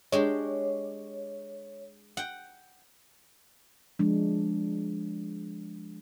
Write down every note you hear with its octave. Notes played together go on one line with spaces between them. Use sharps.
G#3 D4 G4 C#5
F#5 G5
F3 G#3 D4